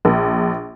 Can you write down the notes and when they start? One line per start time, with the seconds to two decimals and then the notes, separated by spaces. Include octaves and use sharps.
0.05 A#1